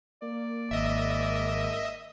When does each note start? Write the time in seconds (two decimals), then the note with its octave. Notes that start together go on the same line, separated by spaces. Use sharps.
0.22 A#3 D5
0.71 G#1 D#5 E5